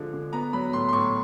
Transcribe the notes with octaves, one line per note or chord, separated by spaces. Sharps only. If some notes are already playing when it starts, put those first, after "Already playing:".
Already playing: D3 F3 G#3
D3
B3 A#5
F#3 B5
A2 C6
C6
A2 C#6